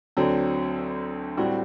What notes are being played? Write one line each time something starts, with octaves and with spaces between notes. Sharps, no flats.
D2 D3 F#3 C4
A2 G3 C4 F#4